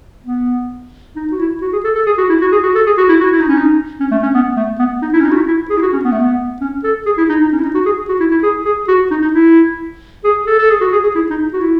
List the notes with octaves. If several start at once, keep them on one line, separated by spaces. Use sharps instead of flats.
B3
D#4
F#4
E4
F#4
G#4
A4
A4
G#4
F#4
E4
F#4
G#4
F#4
A4
G#4
F#4
E4
F#4
E4
D#4
C#4
D#4
C#4
A3
C#4
B3
A3
B3
D#4
E4
C#4
D#4
F#4
E4
E4
G#4
E4
F#4
C#4
B3
A3
B3
C#4
A4
G#4
E4
D#4
D#4
C#4
E4
D#4
F#4
G#4
F#4
E4
E4
G#4
G#4
F#4
D#4
D#4
E4
G#4
A4
A4
G#4
F#4
G#4
G#4
E4
D#4
F#4
E4